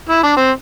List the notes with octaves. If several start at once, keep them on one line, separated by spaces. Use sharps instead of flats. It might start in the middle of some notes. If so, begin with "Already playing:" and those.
E4
D4
C4